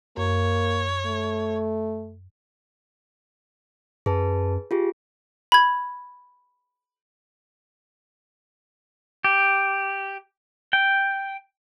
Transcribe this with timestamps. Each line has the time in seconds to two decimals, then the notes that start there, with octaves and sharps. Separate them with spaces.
0.17 F#2 A#3 C#5
1.06 A3
4.06 F#2 G#4 B4 A5
4.71 F4 G4 G#4
5.52 B5 G#6
9.24 G4
10.73 G5